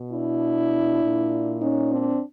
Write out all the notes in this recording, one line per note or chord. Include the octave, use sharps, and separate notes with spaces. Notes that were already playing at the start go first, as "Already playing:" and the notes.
Already playing: B2
D4 E4
A#2
C#4 D#4
C4 D4